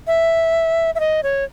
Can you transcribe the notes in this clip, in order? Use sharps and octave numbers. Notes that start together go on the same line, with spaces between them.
E5
E5
D#5
C#5